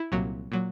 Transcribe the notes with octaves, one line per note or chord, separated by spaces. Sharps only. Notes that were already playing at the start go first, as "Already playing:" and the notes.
Already playing: E4
C2 A#2 F#3
A#2 F#3